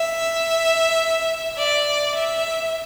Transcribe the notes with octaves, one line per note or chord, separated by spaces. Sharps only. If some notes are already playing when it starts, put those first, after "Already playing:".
Already playing: E5
D5
E5